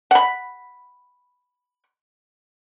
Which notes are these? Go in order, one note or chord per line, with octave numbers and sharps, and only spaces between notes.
F#5 B5